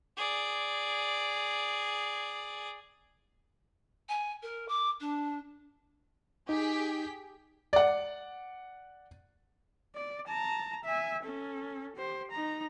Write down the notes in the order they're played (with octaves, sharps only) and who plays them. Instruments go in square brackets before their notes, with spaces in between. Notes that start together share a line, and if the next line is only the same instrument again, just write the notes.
[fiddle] G#4 D5
[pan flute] G#5
A#4
D6
D4
[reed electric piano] D#4 [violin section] G4 G#4 B6
[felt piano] D5 F#5
[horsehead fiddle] D5
A5 A#5
E5 G#5
C#4 A4
G4 C5
D#4 A#5